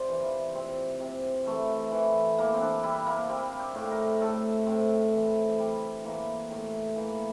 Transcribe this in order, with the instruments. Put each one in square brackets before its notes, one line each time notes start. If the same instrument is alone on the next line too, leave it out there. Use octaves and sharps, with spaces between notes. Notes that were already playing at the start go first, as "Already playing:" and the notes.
Already playing: [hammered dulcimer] C3 C5 D5
E3
F4
C3 C4
C3
E3 A3
E3
E3 A#3
C4
D4
G3 E4
A#3
G3 C4
G4
A2
A#4
A2 A4
A2 C4
E3
G3
E3 A#3
A2
E3 A#3